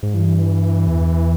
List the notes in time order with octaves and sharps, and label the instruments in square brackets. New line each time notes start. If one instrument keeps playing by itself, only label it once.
[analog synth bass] G#2
[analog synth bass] G2 [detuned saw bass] E3
[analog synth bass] E2